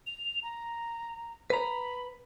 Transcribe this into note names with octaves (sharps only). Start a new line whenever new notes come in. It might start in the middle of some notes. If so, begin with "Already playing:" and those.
F7
A#5
B4 A#5 B5